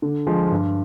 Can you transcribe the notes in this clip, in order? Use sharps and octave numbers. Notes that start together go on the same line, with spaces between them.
D3
F3 G#3
G2